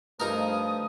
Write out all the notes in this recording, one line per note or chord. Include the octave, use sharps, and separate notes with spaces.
G2 F3 A3 D#4 A#4 D#6